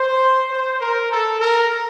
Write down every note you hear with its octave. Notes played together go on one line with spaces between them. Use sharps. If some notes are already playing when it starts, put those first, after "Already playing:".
Already playing: C5
C5
A#4
A4
A#4